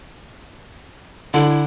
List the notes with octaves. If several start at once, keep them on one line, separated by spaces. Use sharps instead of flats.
D3 E4